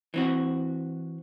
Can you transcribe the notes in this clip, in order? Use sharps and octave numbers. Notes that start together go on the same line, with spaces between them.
E3 C4 F#4